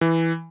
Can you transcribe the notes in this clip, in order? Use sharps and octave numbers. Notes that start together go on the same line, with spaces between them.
E3